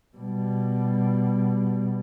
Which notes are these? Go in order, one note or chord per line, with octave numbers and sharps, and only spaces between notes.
B2 G3